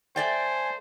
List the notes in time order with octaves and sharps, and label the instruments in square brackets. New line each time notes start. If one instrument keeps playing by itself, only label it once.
[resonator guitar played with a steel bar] A3 D5 G5 [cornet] C5 [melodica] G#5